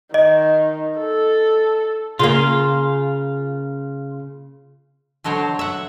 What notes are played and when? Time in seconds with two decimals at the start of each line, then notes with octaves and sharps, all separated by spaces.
0.14 D#3 D#5
0.99 A4
2.19 C#3 A#3 F4
5.24 B2 D3 F#3 C5 C#5
5.59 E5 F#5